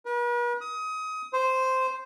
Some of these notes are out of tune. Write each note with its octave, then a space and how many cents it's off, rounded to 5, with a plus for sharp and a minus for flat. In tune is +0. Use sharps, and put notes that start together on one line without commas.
B4 -45
D#6 +25
C5 -5